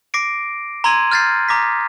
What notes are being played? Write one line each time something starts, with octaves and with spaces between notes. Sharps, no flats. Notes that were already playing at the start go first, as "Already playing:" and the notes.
D6 A#6 C7 D7
A#5 C6 E6 G#6 D#7 F#7
F6 G6 A6 A#6 C7
A#5 D6 D#6 A#6 B6